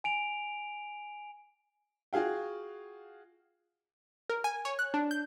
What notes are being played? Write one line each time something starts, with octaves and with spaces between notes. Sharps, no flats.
G#5 D7 F7
F4 F#4 G#4 F5 G5
A#4
G#5
C#5
F#6
D4
G6